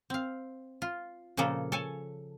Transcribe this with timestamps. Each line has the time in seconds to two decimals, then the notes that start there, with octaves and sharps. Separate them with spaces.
0.10 C4 F5
0.82 F4
1.37 A#2 C#3 F3 A#3 A4
1.72 A4 C#5 G#5 A5